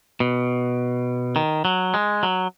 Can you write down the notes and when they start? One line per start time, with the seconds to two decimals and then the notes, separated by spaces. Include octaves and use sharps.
0.20 B2
1.36 D#3
1.65 F#3
1.94 G#3
2.23 F#3